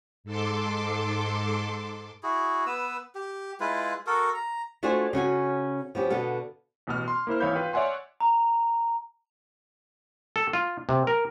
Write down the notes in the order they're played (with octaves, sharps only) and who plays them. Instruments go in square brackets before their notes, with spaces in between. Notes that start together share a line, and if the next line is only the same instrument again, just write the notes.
[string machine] G#2 A4 C6 D6
[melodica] E4 F#4 G#4
B3 B4 E6
G4
G#3 E4 F4 B4
F#4 A4 A#4
A#5
[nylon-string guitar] A3 D4 F4 F#4 C5 G#5
C#3 C#4 F#4 G#5
F3 B3 C#4 G4
B2 D3 B3 A4 F5
[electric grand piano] A1 B2 B3 F6
C6
A#3 E4 C5 F6
G#1 E3 C#5 F5 B5 G6
F4 B4 F5 G5
C#5 D5 E5 F#5 G#5 C6
[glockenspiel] A#5
[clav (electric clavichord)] A4
F4
C3
A#4